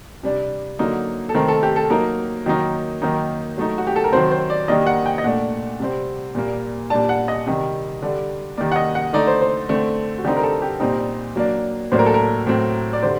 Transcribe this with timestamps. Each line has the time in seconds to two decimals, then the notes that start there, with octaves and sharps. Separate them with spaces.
0.23 C3 G3 D4
0.79 D3 F#3 A#3 D#4
1.29 A4
1.35 D#3 A3 C4 A#4
1.48 A4
1.63 G4
1.76 A4
1.90 F#3 A#3 D#4 A#4
2.46 D#3 F#3 A#3 D#4
3.02 D#3 F#3 A#3 D#4
3.58 F#3 A3 D#4
3.78 F#4
3.87 G4
3.96 A4
4.04 A#4
4.13 D#3 F#3 C4 C5
4.31 C5
4.50 D5
4.68 D#3 G3 A#3 D4 D#5
4.87 F#5
5.06 G5
5.18 D#5
5.24 A#2 A3 D4 F#5
5.80 C3 G3 C4
6.35 A#2 G3 A#3
6.90 A#2 G3 D4 A5
7.09 F#5
7.28 D#5
7.46 C3 D#3 G3
8.02 D3 G3 D4
8.57 D#3 G3 A#3 D5
8.72 F#5
8.76 D#5
8.95 F#5
9.13 D3 A3 D#4 D5
9.27 C5
9.41 C5
9.69 D3 A3 C4
10.18 F#4
10.24 D3 G3 C4 D#4 G4
10.37 A#4
10.43 A4
10.62 G4
10.80 A#2 G3 C4 D#4
11.36 F#3 A#3 D4
11.92 A2 F#3 A#3 D4 C5
11.99 A#4
12.06 A4
12.14 A#4
12.47 A2 F#3 C4
12.93 D5
13.02 D3 G3 C5